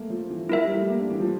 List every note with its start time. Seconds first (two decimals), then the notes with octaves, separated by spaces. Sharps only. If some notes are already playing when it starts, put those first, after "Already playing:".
Already playing: A3 A#3
0.10 F3
0.30 E3
0.49 F3 E4 A#4 E5
0.63 G3
0.76 A3
0.89 A#3
0.99 D4
1.10 E3
1.20 F3